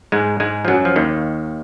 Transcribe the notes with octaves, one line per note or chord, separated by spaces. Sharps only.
G#2 G#3
G#2 G#3
F3
F#2 F#3
F3
D#2 D#3